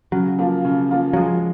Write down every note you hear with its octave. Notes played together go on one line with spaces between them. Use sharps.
C#3 F#3
F3 A#3 F4
C#3
F3 A#3 F4
F#3
F3 G#3